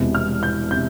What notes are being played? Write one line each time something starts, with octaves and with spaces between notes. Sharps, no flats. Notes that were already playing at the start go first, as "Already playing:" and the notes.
Already playing: E1 E2 C3
F6
G6
C3 G6